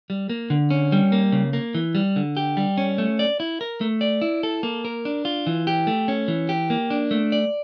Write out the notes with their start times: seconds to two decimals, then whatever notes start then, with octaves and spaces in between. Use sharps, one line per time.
0.10 G3
0.30 A#3
0.50 D3
0.70 C#4
0.92 G3
1.12 A#3
1.32 C#3
1.53 A#3
1.75 E3
1.95 G3
2.16 D3
2.37 G4
2.57 G3
2.78 C#4
2.98 A3
3.19 D5
3.40 E4
3.61 A#4
3.81 A3
4.01 D5
4.22 E4
4.43 A4
4.63 A#3
4.85 A#4
5.05 D4
5.25 F4
5.47 E3
5.67 G4
5.87 A3
6.08 C#4
6.28 E3
6.49 G4
6.70 A#3
6.90 D4
7.11 A3
7.32 D5